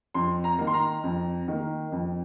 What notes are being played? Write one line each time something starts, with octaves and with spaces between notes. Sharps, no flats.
F2 C6
A#5
D#3 A#3
C6
A#5
F2
D#3 A#3
F2